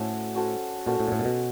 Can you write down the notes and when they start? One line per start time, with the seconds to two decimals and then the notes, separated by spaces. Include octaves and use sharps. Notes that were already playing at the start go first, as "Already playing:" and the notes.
Already playing: A2 C#4 F#4 A4 C5
0.35 C#4 F#4 A4 C5
0.86 A#2 C#4 F#4 A4 C5
1.00 A2
1.08 A#2
1.12 A2
1.19 A#2
1.25 B2